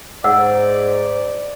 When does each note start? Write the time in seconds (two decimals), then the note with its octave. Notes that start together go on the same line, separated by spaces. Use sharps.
0.24 G#2 D5 F#5 E6